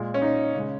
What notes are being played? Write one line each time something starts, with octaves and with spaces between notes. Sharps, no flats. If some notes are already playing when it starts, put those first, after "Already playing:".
Already playing: A#2 G#3
C#4
D#4
C#3 G#3